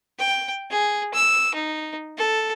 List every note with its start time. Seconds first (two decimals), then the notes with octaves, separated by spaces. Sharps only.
0.19 G5
0.71 G#4
1.14 E6
1.55 D#4
2.18 A4